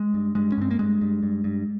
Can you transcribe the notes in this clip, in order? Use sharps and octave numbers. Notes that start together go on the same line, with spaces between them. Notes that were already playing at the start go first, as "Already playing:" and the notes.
Already playing: G#3
G2
G2 G#3
C#4
G2 C4
A#3
G2 G#3
G2
G2
G2